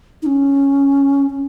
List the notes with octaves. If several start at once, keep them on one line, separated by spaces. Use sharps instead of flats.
D#4
C#4
C#4